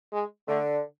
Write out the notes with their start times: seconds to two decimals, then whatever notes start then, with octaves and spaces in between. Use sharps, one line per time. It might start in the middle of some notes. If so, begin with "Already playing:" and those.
0.12 G#3
0.48 D3 A3